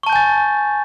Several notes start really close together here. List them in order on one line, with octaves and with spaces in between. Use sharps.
C#6 A5 G6 G#5 A6